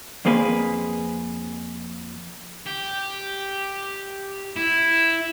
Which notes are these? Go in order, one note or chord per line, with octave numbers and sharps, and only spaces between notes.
F2 A#3 C4 G#4 B4
G4
E4